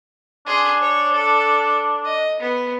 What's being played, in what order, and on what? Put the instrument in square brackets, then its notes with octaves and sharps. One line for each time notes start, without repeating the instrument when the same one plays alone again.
[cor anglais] D4 [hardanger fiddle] G#4 C6
[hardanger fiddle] C#5
A4
D#5
B3